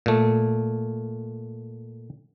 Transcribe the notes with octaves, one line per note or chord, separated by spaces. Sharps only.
A#2 A3